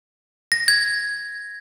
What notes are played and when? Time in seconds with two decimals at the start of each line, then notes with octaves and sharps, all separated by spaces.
0.52 A#6
0.68 G#6